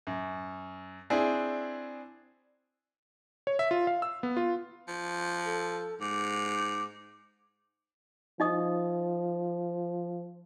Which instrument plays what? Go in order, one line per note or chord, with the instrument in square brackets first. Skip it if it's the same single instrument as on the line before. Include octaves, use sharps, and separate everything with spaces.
[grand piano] F#2
C4 D4 E4 G#4
[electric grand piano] C#5
E5
F4
F5
E6
B3
F4
[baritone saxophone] F3
[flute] A4
[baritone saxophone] G#2 [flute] D6
[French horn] F3 [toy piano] D#4 D#5 D#6